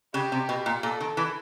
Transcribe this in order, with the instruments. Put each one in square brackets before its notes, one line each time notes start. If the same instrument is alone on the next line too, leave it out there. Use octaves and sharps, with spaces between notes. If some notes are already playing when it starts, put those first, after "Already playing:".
[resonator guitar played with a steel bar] C#3 [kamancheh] G4
[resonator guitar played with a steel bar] C3
B2
A#2
[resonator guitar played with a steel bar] A#2 [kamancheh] A4
[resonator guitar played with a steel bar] D#3
E3